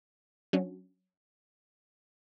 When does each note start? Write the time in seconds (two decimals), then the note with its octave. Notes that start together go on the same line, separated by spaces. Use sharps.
0.53 F#3 C#4 D4